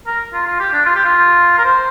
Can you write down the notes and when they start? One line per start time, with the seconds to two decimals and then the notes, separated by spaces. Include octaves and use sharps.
0.07 A#4
0.34 F4
0.47 F4
0.60 G4
0.73 D4
0.86 F4
0.95 G4
1.05 F4
1.58 A#4
1.65 C5